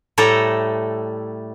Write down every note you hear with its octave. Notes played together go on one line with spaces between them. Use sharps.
A2 G3 A3 A4 A#5